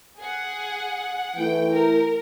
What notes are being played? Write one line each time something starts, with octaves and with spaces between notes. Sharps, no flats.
G#4 F#5
E3 A3 E4 G5
A#4